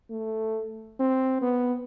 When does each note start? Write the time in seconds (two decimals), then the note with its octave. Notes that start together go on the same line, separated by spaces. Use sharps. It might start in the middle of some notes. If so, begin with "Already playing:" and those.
0.10 A3
0.99 C4
1.42 B3